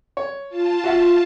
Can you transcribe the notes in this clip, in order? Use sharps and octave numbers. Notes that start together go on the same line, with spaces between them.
C#5
F4 A5
F#4 E5 F#5